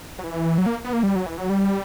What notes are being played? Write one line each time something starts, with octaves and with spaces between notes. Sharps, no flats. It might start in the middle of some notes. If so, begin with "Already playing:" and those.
F#3
E3
F#3
A#3
B3
A#3
G3
F#3
E3
F#3
G3